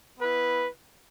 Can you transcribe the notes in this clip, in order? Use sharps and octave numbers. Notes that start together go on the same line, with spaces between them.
B3 E4 B4